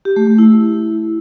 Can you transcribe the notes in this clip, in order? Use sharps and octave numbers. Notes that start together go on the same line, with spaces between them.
G4
A3
A3
E4